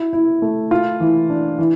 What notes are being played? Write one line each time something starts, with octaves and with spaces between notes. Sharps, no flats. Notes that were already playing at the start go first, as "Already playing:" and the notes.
Already playing: E4
E4
A3
F4
E3
D4
E3